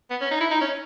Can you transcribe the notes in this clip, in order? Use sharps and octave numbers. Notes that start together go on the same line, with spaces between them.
B3
C#4
D#4
E4
D#4
C#4